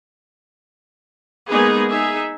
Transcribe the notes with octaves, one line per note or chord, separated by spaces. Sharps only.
G#3 A#3 B3 D#4 G#4 B4
D#4 G#4 E5